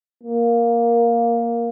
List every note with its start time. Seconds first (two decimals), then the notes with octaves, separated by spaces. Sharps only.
0.23 A#3